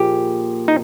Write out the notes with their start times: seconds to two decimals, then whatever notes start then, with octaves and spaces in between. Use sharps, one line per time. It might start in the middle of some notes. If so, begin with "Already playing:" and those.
Already playing: A#2 F3 A#3 F4 G4 G#4
0.68 D#4